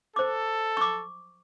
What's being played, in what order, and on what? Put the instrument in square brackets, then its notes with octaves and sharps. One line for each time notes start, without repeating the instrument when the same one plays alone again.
[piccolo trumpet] A4 [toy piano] C5 D6
[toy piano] C#6 D6